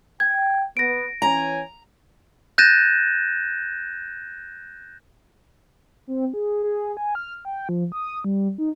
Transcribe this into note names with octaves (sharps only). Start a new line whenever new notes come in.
G5 G#6
B3 A#6 D7
E3 C#4 G#5 A#5
F#6 G6 A6 A#6 D#7 E7
C4
G#4
G#4
G#5
F6
G5
F3
D#6
G3
D#4